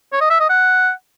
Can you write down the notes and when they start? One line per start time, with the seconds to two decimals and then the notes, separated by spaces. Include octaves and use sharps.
0.13 C#5
0.21 D#5
0.30 E5
0.40 D#5
0.50 F#5